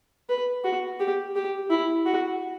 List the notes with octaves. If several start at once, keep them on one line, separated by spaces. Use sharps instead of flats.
B4
F#4
G4
G4
E4
F#4